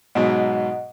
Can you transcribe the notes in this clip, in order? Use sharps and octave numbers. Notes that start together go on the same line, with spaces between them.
G#2 B2 F#3 D#5 F#5 A#5